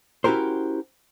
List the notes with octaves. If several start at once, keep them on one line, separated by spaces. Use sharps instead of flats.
C#4 E4 F#4 G4 A#4 C5